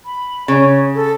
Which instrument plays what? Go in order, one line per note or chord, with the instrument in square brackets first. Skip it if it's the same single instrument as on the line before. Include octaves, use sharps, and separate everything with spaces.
[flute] B5
[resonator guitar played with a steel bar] C#3 [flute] C#5
[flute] A4